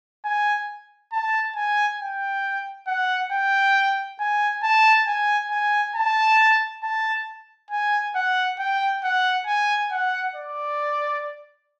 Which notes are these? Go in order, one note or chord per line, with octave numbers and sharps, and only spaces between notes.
G#5
A5
G#5
G5
F#5
G5
G#5
A5
G#5
G#5
A5
A5
G#5
F#5
G5
F#5
G#5
F#5
D5